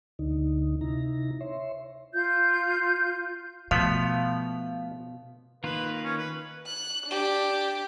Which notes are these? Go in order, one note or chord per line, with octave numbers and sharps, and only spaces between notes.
D2 D3 D#4
C3 D#4 E4 A#5
C#5 E5 C6
F4 G6
B2 F3 A3 B3 F5
D#3 A#3 F4 B4
C#4
B4
F#6
D4 G4